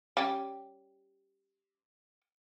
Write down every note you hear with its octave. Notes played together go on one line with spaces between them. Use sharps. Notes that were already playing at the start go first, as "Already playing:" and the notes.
G3 C#4 G4